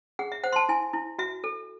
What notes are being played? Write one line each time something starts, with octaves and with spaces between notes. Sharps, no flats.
G#4 F#5
E5
C5 F#5
C6
A5
E4 G#5
E4
F#4 E5
A4